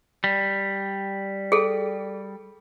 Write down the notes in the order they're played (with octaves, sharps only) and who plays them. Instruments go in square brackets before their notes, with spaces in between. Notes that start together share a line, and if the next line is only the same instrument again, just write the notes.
[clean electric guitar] G3
[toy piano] G#4 A4